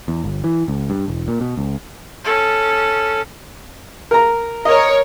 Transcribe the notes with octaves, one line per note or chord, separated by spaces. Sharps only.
E2
G1
E3
C#2
G2
E1
A#2
B2
C#2
C#4 A4
A#4 A#5
A#4 C#5 D#5